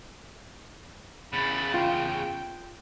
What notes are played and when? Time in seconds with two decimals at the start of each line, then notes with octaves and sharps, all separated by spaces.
1.33 E2 C#3 B5 A6
1.74 F4 G5